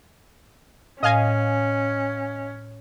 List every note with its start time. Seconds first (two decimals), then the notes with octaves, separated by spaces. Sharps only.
1.03 A2 C#4 D#5 F5 G#5